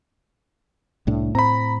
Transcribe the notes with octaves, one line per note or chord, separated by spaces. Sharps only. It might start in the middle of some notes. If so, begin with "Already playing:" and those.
C2 A2 D4
A2 C4 A#5 B5